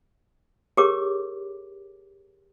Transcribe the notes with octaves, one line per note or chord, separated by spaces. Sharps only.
G4 G#4 A#4 C#5 D6